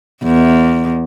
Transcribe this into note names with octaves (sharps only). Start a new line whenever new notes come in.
E2